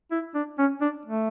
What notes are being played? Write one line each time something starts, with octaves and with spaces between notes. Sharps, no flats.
E4
D4
C#4
D4
A3